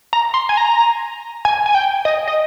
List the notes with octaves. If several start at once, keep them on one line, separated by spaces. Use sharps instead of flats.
A#5
C6
G#5
A#5
G#5
G#5
G5
D#5
D#5